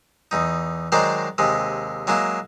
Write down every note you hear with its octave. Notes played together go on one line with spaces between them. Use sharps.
E2 D#4
D#3 F#3 G#3 A#4 C5 D5
D#2 C3 G#3
F#3 G#3 A#3 E4